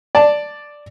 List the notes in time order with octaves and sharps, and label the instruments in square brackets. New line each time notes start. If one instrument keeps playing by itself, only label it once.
[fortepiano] D5 A5